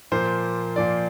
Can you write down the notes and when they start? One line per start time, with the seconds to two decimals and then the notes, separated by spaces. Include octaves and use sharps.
0.12 A#2 F3 A#3 C5
0.76 A#2 F3 A#3 D5